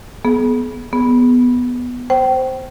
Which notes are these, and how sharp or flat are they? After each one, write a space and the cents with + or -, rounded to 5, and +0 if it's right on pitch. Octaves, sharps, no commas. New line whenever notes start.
B3 -20 G#4 +40
B3 +0 G#4 +0
C5 +0 G5 -25